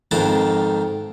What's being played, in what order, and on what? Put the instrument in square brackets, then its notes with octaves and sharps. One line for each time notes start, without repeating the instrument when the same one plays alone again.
[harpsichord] F2 G#2 D#3 F4 F#5 A5